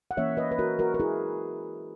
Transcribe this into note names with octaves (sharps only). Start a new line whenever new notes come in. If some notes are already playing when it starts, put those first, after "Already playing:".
F#5
E3 A#3 C#4 C#5 E5
B4 D#5
B4
F#4 A#4
F#4 A#4
A#4
E4 G#4